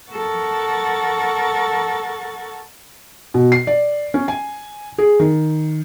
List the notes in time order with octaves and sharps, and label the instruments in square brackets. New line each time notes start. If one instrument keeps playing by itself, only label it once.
[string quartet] A4 A#4 F#5 C#6 A6
[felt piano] B2
C7
D5
C#4
G#5
G#4
D#3